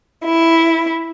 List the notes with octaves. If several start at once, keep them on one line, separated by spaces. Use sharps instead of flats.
E4